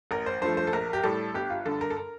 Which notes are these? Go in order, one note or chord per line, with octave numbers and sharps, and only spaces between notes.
A1 A#4
C5
G2 F3 A3 C5
C5
A4
A#1 A#4
G4
A2 G3 A4
G1 G4
F4
G2 D3 A4
A#4
A4
A#4